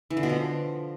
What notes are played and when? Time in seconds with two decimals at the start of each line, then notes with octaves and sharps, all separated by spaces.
0.10 E3
0.17 D3
0.23 B2
0.29 F3